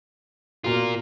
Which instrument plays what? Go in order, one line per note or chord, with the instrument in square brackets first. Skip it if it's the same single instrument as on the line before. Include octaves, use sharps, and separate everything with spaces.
[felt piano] B2 F#4 [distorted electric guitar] F4 A#4